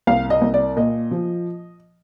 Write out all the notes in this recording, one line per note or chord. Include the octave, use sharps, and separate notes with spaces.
C2 F5
D#5
C2
D5
A#2 D#5
F3